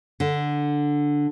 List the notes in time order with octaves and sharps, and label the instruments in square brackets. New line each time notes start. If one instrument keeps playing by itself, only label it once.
[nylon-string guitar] D3